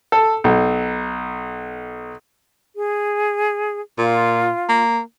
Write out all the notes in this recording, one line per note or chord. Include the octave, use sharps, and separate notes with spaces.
A4
B1
G#4
A#2 F4
A#3